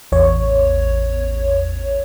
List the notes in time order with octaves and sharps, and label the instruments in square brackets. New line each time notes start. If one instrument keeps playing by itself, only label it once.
[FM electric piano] A1 E2 C#5